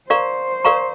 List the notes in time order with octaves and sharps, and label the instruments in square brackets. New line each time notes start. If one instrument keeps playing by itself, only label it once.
[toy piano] A#4 D5 F5 A#5 C#6 [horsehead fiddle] C5
[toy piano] A#4 D5 F5 A#5 C#6